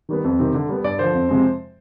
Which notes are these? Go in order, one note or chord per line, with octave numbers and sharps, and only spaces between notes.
D#3 G3 B3
F2
C3 D#3 G3 C4
D3
G3 B3
G2 D5
D3 F3 C5
F2
C3 F3 G#3 C4